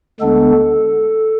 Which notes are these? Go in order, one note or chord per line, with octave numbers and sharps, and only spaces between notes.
D2 D3 G#3 B3 D4 A4